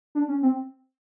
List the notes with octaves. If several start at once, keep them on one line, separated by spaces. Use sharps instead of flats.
D4
C#4
C4